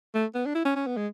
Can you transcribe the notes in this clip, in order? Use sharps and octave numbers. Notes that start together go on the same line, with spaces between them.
A3
B3
D4
E4
C#4
C#4
B3
G#3